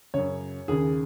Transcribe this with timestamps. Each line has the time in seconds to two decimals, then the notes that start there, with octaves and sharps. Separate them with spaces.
0.14 F#2 C#3 C#5
0.68 D#2 C#3 G#4